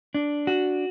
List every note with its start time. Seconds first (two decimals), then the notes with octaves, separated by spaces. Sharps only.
0.14 D4
0.47 F#4